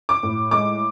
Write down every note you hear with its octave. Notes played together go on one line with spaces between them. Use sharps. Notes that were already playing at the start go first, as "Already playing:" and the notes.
D6
A2
G#3 D6